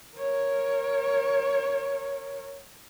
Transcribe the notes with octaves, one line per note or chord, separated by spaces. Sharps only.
A#4 C#5